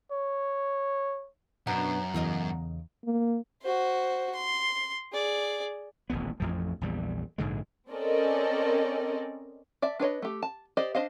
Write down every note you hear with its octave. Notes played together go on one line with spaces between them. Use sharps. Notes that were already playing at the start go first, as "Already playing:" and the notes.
C#5
F#2 B2 B3 D4 F#5 A#5
E2 C#3 A#4 D#5
A#3
F#4 C5
C6
G#4 D5
D#1 A1 D2 B3
A1 F2 F3
A#1 E2 G3
A#1 G#2 D3 G#3
C4 C#4 A4 A#4 D5 D#5
D5 E5 A5
D4 B4 C#5 D#5
A3 G4
A5
G4 C5 D5 D#5
D4 C5 D#5 F5